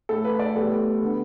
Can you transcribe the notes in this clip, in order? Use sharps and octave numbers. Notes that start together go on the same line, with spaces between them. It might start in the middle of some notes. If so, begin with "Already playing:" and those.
A2 A3 A4
B4
B4
D5
A2 G3 B3 A4
D3 B3